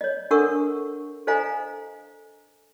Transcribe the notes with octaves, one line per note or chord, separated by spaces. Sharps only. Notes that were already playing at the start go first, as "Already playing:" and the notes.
C#5 D#5
D4 A4 A#4 F#5 C#6 E6
A4 C5 D#5 F5 G#5 A#5